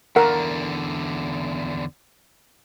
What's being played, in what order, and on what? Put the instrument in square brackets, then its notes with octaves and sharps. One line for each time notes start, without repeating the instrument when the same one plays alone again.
[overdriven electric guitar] E2 D3 [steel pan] A#4 F#5